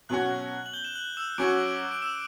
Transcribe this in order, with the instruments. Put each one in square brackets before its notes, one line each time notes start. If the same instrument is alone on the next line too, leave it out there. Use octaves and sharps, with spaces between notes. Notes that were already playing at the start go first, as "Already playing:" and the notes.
[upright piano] B2 F#3 C#4 F#4 [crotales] F#6 F#7
[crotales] F#7
G6 G7
E7
F#6 F#7
E6 E7
[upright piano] F#3 C#4 F#4 [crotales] D6 D7
[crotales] D7
E6 E7